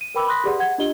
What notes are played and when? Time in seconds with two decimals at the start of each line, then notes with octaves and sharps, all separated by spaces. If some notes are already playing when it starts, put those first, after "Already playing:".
0.01 D#7
0.15 A#4 B4 G5 B5 D6 E6
0.27 B5 C6 D#6 F#6 A#6 B6
0.44 G4 G#4 B4 D5 F#5 C6
0.60 F#5 G#6
0.78 D4 F4 G4 D#5 G7